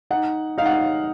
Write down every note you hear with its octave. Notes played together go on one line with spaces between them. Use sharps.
D#4 F#5
D#4 F5
F#5
F5